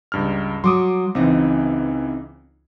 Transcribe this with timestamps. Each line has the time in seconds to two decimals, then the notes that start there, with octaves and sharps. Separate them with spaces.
0.12 C#2 G2 F6
0.64 F#3 C6 D6 D#6
1.15 C#2 E3 C4 D#4